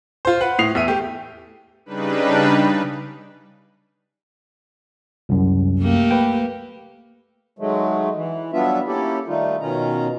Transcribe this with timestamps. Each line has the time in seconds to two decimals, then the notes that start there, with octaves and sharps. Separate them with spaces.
0.25 F4 C5
0.41 B4 F#5
0.59 A2 D#6 C7 F7
0.75 E2 E5 D#7
0.88 A3 G4
1.86 C#3 G3 D4 D#4 B4
5.29 C2 F#2
5.81 A3 A#3 G4
6.11 B4 G5
7.59 D#3 F#3 G#3 A3
8.15 E3
8.53 F#3 G3 B3 D4 F4 E5
8.87 A#3 C#4 E4 G4 A4
9.27 D#3 G3 A3 D#4 F4
9.61 B2 D#3 C#4 F4 A#5